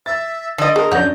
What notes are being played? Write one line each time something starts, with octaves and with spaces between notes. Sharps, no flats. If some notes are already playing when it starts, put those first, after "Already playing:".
E5 A6
D3 D5 D#5 D#6
G#4 A#4
F#2 D4 C#5 F#5 G6 A#6